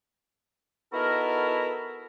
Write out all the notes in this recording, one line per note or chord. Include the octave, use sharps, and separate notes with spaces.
B3 D#4 E4 F#4 A4 A#4